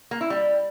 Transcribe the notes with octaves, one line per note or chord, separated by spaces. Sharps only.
A#3
E4
G3